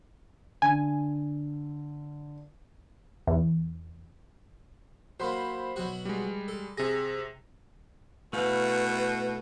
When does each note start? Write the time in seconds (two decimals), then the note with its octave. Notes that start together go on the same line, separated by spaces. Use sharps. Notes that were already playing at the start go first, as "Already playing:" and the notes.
0.62 D3 G#5
3.27 E2
5.20 F#3 A#3 C5 B5 C6
5.76 B2 F#3 F#4
6.05 G3 G#3
6.48 A4
6.77 C3 G#4 A#6
8.33 B2 A3 E4 B4 F5